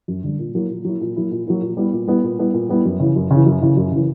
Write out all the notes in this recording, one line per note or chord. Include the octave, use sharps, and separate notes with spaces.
F#2
D3 G3
A#2
F#3 A#3 E4
A#2
F#3 A#3 E4
A#2
F#3 A#3 E4
A#2
F#3 A#3 E4
A#2
G3 B3 E4
A#2
G3 B3 E4
A#2
G3 B3 E4
A#2
G3 B3 E4
F#2
C#3 E3
F#2
C#3 E3
F#2
C#3 E3
F#2
C#3 E3